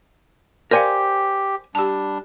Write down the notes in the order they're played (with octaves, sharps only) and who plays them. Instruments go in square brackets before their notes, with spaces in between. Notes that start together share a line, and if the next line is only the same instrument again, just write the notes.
[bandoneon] G4 [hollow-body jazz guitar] A#4 C5 G#5 [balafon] D5 F5
[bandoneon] G3 D4 [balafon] G4 A5